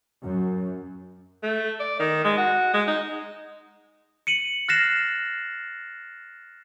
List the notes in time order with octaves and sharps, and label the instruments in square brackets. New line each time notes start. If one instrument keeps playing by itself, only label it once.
[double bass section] F#2
[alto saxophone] A3
D5
D#3
G#3
F#4
G#3
D#4
[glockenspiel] C#7 D#7 F#7
F6 F#6 A6 A#6 C7 E7